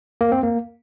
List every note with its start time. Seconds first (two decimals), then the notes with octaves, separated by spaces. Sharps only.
0.21 A#3
0.32 C4
0.43 A#3